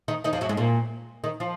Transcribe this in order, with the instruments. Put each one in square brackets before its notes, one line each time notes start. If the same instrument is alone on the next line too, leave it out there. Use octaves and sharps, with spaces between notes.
[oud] D#3 D#4
D#3 D#4
F2 F3
F#2 F#3
G#2 G#3
A#2 A#3
D#3 D#4
F3 F4